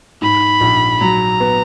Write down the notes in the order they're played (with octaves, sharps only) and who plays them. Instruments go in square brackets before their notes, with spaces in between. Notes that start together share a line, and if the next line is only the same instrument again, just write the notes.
[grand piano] G#2 [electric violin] B5
[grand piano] A#1
[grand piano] F#3 [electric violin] A#5
[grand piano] B3